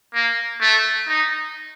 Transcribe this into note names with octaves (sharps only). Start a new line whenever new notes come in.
A#3
A3
D#4